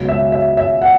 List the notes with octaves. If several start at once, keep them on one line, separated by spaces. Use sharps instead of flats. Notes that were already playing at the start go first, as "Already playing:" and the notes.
Already playing: C#2 B2 F#3
E5
E5
E5
F#5